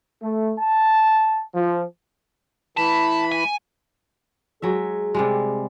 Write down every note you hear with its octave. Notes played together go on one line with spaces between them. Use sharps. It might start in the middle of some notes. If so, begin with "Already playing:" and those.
A3
A5
F3
E3 A5 B5
G#5
F#3 G#3 G#4 E5
C3 G3 G#3